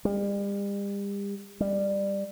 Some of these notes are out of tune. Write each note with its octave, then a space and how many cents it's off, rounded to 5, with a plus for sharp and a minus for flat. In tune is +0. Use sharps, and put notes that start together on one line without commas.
G3 +40
G3 +15